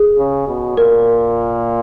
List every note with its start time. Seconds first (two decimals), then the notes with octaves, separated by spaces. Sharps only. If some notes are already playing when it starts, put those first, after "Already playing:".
Already playing: G#4
0.18 C#3
0.47 B2
0.77 A#2 A#4